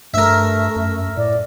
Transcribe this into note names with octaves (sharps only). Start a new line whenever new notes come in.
G2 A3 A#4 E5
F#2
A2 D5